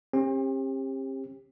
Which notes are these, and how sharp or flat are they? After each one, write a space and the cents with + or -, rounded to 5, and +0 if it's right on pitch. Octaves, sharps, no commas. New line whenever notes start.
C4 +45 G4 +25